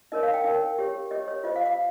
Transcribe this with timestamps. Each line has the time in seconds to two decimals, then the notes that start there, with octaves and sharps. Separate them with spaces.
0.12 D#4 A#4 C#5 D#5
0.23 F5
0.34 G5
0.44 D#4 A#4 C#5
0.79 G4 C#5
1.11 G4 C#5 D#5
1.28 C#5
1.44 F4 C5 D#5
1.56 F5
1.66 F5